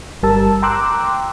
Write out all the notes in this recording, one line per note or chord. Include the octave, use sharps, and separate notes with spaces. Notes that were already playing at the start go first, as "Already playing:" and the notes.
G1 G3 A#4 A5 E6
G5 A#5 C6 D6 E6 F#6